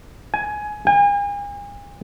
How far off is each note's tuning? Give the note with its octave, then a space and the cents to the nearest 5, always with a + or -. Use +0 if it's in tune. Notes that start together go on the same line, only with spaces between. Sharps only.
G#5 +15
G#5 -40